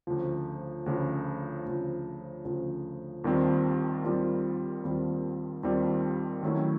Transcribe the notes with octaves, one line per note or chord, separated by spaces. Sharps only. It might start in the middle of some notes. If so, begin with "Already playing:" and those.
D2 C#3 F3
D2 C#3 F3
D2 C#3 F3
D2 C#3 F3
D#2 D#3 G3 C4 F4
D#2 D#3 G3 C4 F4
D#2 D#3 G3 C4 F4
D#2 D#3 G3 C4 F4
D#3 F#3 A3 C#4 E4